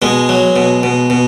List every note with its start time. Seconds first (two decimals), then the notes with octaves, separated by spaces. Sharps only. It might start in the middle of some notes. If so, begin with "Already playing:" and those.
0.02 B2 G#3
0.29 F#3
0.56 B2
0.83 B2
1.10 B2